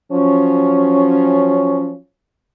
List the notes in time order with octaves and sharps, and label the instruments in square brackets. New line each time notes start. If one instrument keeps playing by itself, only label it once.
[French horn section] F3 F#3 C#4